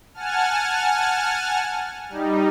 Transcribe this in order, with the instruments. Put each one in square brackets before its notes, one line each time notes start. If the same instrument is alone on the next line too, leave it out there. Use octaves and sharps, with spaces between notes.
[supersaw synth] F#5 G#5 A5 F6
G3 D#4